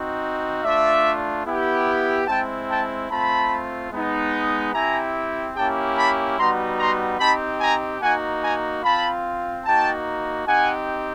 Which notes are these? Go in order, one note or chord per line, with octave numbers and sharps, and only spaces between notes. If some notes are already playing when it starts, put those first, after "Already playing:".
Already playing: C4 D#4 F#4
A3 D4 F4 D5 E5
B3 E4 G4
G#3 C4 E4 G5 A5
G5 A5
A3 C4 F4 A5 B5
G#3 B3 D#4
C4 E4 G4 G#5 A#5
A#3 C#4 E4 G4 G5 A5
A5 B5
G3 B3 D#4 F#4 A#5 C6
A#5 C6
C4 D#4 G4 A5 B5
G#5 A#5
A#3 D#4 F#4 F#5 G#5
G#5 A#5
C4 F4 A5 B5
A#3 D#4 F#4 G5 A5
C4 D#4 G4 F#5 G#5